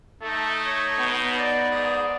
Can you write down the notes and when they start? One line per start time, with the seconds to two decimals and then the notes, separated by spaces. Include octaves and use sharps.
0.22 A3 D#4 A4
0.65 C#5
0.98 B2 B3
1.38 D5
1.71 G#2 G#4